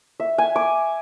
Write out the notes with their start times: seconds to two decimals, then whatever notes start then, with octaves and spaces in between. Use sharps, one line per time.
0.20 E5
0.38 G#5
0.56 D6